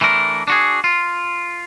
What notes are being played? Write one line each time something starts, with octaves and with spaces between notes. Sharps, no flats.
E3 A3 D4 A#4
D4 F#4 G#4
F4